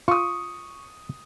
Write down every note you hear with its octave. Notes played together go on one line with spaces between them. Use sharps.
F4 C#6 D#6